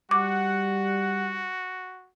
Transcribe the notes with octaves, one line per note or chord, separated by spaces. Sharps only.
G3 F#4 F#5 D6